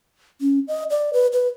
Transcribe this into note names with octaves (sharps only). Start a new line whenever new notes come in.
C#4
D#5
D5
B4
B4